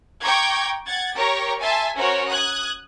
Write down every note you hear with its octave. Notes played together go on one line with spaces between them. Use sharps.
G5 A#5 C#6 D6 G6 G#6
F#5 G#6 A6
G4 A#4 C#5 A#5 C#6
E5 G#5 A5 C6
C#4 F#4 A#4 C5 C#5
D#6 F#6 G#6